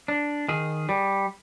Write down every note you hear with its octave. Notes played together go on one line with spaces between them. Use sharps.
D4
D#3 G#4
G3